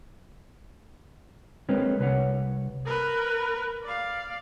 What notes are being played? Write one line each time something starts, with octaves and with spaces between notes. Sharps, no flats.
G#3 C4 A#4 B4 C#5
C2 B4 C#5 F#5
A#4 B4
D5 F5